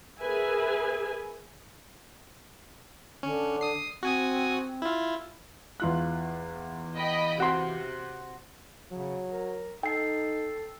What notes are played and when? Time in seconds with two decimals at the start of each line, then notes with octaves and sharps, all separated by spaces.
0.21 G#4 A#4 B4 E5 G#5
3.23 D3 C#4
3.61 D#6 C7
4.03 C4 F#4 G#5 D#6
4.82 E4 F4
5.80 E2 F4 F#6
6.96 D#5 G5 B5
7.40 C3 F#4 C6
8.92 C#3 F#3
9.31 A#4
9.83 D#4 A4 G5 C7